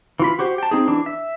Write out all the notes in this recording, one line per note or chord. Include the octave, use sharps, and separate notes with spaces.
E3 F4 B5
F#4 G4 C5
G5 A5
C4 D#4 G#4
E3 D4
E5